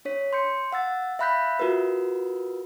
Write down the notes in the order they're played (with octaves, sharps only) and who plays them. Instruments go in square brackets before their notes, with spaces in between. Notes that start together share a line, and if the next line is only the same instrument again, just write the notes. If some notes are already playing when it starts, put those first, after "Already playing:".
[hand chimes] D4 C#5 B6
C6 G6 C#7
F5 F#5 E6 A6
E5 F5 B5 F#6 G6 B6
E5
F4 F#4 A#4 B4